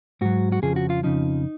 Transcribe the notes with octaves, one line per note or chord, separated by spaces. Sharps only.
G#2 F#3 F#4
F#4
F2 C#3 F3 G#4
F#4
F4
F2 C#3 F3 D#4